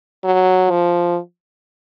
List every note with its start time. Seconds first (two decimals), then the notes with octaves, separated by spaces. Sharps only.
0.24 F#3
0.71 F3